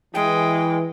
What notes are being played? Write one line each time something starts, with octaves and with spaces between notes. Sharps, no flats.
E3 G#3 G5